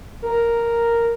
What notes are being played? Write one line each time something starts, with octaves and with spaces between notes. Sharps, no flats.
A#4